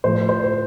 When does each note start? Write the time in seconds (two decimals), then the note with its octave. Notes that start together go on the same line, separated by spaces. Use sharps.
0.04 A2 F3 C5
0.29 C5
0.44 C5